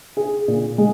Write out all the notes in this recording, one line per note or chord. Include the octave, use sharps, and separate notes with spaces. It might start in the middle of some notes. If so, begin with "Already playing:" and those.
G#4
A#2
G#3